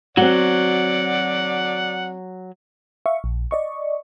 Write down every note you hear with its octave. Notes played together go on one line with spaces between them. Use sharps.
F#3 C4 F#4 D5 F#5
E5 F5 C#6
A#1
D5 D#5 C#6